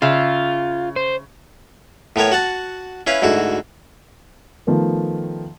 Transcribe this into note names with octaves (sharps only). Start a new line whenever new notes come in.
C#3 F4 E5
C5
A2 B3 A#4 C#5
F#4 F#5 A5
C#4 E4 B4 F5
D2 G#2 E4 F#4
D#3 F3 A3 B3